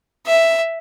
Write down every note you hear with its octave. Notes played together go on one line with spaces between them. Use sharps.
E5